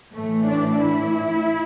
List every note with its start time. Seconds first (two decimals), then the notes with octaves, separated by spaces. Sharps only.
0.13 A2 E3 A3
0.47 D4
0.80 E4